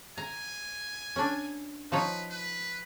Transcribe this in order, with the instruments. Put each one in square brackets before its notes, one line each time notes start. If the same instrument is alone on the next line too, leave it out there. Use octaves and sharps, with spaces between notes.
[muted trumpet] G#5 [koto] A#5
[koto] C#4 D4
[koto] F3 D#4 C#5 [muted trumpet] B4
[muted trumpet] B4